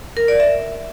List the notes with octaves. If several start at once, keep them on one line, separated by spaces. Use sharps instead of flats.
A#4
D5
E5